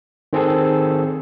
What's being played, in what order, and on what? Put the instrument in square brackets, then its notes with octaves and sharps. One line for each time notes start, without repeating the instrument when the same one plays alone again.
[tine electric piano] D#3 C4 G#4 A4